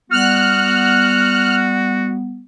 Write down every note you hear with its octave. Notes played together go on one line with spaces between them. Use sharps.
G3 B3 F#4 F6 F#6